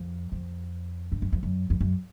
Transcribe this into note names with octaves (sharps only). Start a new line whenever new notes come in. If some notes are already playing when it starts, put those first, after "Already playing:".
Already playing: F2
F2
G2
F#2
F2
F#2
F2
F#2